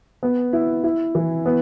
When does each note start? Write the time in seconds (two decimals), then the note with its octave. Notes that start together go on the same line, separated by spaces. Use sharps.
0.23 B3
0.53 E4
0.84 E4
1.15 E3
1.46 B3